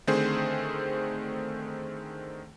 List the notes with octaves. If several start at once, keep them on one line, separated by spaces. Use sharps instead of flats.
D3 D#3 A3 C4 G#4 C5